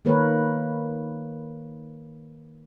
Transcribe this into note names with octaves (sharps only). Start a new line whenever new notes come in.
D#3 A#3 A#4 B4 C#5